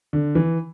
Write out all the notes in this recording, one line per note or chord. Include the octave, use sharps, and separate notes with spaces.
D3
E3